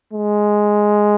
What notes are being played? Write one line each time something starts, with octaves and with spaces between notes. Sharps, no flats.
G#3